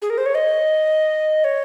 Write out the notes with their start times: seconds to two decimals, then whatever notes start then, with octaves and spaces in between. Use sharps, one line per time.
0.02 G#4
0.10 A#4
0.18 C5
0.26 C#5
0.35 D#5
1.44 C#5